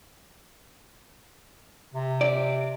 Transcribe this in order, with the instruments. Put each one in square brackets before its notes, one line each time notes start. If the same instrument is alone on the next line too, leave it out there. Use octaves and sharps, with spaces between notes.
[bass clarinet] C3
[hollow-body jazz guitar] D5